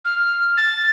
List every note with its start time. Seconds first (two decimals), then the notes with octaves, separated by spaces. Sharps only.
0.05 F6
0.57 A6